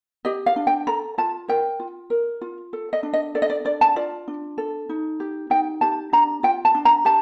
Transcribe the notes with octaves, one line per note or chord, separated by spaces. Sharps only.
G4 D#5
F5
D4
G5
A4 A#5
F4 A5
A#4 G5
F4
A#4
F4
A4
D#5
D4
D#5
A4 D5
D#5
D5
D4 D5
A5
F4 D5
D4
A4
D#4
G4
D#4 G5
G4 A5
D4 A#5
F4 G5
A5
D4
A#5
G4 A5